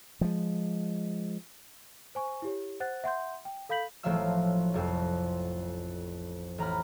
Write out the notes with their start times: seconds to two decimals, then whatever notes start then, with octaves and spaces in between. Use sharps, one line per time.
0.21 F3 G#3
2.15 C5 G#5 C#6
2.42 E4 G4 C#5
2.80 C5 F#5 F#6 A6
3.04 E5 F#5 C6 G6
3.45 G5
3.69 A4 F5 B5 G6 B6 F#7
4.03 A1 F3 F#3 A3 F5 E6
4.74 F1 F2 C4
6.58 A1 A#5 B5 F6